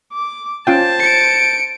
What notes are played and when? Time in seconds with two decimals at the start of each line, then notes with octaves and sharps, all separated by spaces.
0.13 D6
0.67 C#4 F4 C5 G5 A5
0.99 C#7 D7